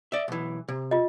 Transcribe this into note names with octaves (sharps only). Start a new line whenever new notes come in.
D5 E5
B1 E3
C3
F4 D#5